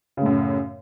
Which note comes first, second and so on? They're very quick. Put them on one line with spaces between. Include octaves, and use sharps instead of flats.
C#3 A2 F#2